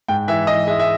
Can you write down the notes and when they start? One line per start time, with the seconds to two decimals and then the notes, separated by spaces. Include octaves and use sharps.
0.08 G#2 G5
0.28 E3 E5
0.47 E3 D#5
0.67 G#3 E5
0.79 E5